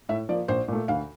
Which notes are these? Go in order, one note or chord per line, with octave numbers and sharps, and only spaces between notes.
A2 E5
F3 A#3 D5
A#1 C5
A#2 A3
D2 F5